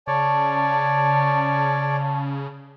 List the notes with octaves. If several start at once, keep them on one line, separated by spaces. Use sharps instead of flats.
C#3 C#5 D5 A5